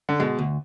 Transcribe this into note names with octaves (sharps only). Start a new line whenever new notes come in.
D3
B2 G#3
D2